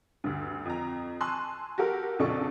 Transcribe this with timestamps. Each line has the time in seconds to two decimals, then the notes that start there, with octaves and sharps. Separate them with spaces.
0.24 D2 G2
0.65 F2 A#5
1.20 G#5 A5 C6 C#6 E6 F#6
1.78 F#4 G4 A4 A#4
2.19 A#1 F2 C#3 D4 A4 C#6